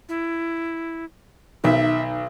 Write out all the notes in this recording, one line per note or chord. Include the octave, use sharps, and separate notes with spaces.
E4
B1 D#3 E5